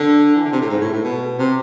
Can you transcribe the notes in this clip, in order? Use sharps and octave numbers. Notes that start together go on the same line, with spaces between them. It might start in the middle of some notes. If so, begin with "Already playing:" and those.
Already playing: D3
E3
D3
C3
A2
G#2
A2
A2
B2
C3